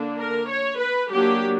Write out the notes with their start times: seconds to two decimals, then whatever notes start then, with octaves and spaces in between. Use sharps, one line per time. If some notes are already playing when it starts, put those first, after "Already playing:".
Already playing: D3 A#3 D4
0.19 A#4
0.49 C#5
0.79 B4
1.10 F#3 A#3 D4 G4